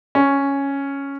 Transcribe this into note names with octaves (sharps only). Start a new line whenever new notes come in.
C#4